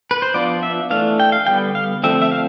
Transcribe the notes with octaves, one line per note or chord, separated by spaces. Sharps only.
B4
C5
F3 B3 D4 F4 D5
E5
E3 A3 D4 F5
G5
F5
D3 G3 B3 G5
F5
D3 F3 A3 C4 E5
E5
F5